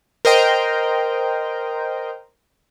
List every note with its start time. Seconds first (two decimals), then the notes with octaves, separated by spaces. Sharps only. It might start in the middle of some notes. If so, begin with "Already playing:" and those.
0.25 A#4 C5 D#5 G5